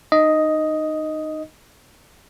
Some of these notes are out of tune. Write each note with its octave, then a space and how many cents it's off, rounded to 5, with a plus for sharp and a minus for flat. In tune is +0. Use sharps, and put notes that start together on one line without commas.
D#4 -20 D#5 +5